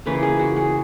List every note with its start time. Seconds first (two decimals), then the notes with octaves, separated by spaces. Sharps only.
0.06 C#3 E3 A#3 B4
0.23 G#4
0.39 F#4
0.56 G#4